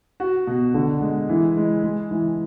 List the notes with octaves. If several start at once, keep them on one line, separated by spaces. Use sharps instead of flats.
F#4
B2
D3
G#3
E3
G#3
G#3
E3